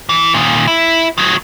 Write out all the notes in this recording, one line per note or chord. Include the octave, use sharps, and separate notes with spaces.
E3
A#2 D#3
E4
D#3 F#3